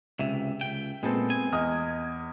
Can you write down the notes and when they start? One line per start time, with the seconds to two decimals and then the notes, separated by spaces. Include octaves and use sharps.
0.19 C#2 C3 E5
0.61 C#2 G5
1.03 A#2 G#3 B3 C4 A4
1.30 G#5
1.52 E2 D#5 D#6 F6